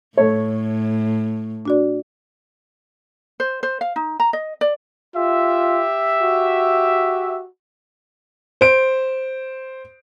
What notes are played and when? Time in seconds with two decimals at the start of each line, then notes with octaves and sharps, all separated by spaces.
0.17 A2 A3 C#5
1.65 D4 F#4 D5
3.40 C5
3.63 C5
3.81 F5
3.96 D#4
4.20 A#5
4.33 D#5
4.61 D5
5.16 F4 G4 E5
6.22 F#4
8.61 C5 D7